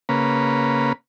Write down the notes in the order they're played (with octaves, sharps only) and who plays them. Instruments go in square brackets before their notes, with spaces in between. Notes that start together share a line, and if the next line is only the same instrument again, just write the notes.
[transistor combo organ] C#3 A#3 B4